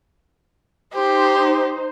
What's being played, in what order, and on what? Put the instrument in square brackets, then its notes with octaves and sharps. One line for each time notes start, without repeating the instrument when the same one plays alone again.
[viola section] D#4 C5 [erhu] G4